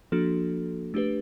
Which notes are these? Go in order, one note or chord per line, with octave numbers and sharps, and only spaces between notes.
F3 A#3 D4 F#4 A4
A3 D4 G4 B4